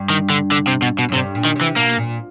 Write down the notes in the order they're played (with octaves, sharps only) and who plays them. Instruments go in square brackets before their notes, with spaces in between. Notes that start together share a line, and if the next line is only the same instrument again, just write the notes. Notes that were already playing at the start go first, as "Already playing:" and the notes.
Already playing: [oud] G2
[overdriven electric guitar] D#3
D3
D3
C3
B2
B2
[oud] F#2
[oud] G2 [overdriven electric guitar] C3
[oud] A#2
[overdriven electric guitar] D#3
[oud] C3
[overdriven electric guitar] E3
[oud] B2 [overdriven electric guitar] A#3
[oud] A#2